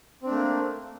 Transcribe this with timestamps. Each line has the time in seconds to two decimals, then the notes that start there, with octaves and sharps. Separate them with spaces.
0.22 C4
0.26 D4
0.31 A3
0.35 A#3